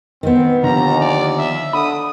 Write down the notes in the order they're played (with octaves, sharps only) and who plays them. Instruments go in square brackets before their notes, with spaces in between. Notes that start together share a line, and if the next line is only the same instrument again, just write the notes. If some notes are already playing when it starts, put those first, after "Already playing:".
[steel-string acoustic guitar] D#3 B3 [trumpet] C4
[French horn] D#2 [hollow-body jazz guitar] D3 F3 [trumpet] A#5
[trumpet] D5
E5
[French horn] D3 [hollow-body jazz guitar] B5 [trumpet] D#6